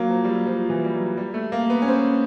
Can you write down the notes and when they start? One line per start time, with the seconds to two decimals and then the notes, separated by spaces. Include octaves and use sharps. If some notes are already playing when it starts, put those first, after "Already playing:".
Already playing: F#3 A#3
0.10 F3
0.24 G3
0.28 F#3
0.46 F3
0.70 E3
0.85 G3
0.93 F#3
1.17 G3
1.34 A3
1.52 A#3
1.70 B3
1.82 C#4
1.88 C4